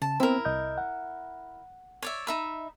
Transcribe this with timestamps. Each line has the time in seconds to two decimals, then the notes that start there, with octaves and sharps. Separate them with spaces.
0.02 C#3 A5
0.20 B3 C4 E4 A#4 C5
0.45 C2 D#5 G6
0.78 F#5
2.02 C#5 D5 E5
2.27 D#4 E5 B5